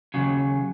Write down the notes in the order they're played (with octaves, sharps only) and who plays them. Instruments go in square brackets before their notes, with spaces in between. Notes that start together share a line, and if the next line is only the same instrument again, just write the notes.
[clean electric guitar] D#2 C#3 F#3